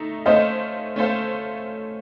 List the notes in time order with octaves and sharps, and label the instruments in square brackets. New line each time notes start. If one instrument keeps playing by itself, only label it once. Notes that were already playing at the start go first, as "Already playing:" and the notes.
Already playing: [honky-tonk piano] A3 D#4 A4
[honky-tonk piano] A3 C#4 A4 C5 F5 [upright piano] D#5
[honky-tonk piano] A3 C#4 A4 C5 F5